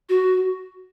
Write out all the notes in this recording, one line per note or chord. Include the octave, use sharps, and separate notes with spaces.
F#4